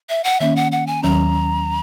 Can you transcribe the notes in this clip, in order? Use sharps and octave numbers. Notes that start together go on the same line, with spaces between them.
E5
F#5
D#3 A#3 C#4 E5
F#5
F#5
G#5
D#2 D#3 F#3 C#4 A#5